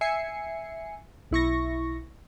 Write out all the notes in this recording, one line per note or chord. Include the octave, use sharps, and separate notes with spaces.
E5 G#5 C7 C#7
B1 E4 C#6 A#6